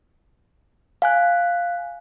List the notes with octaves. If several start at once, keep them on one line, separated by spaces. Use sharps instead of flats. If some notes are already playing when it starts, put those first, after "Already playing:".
F5 G#5 F#6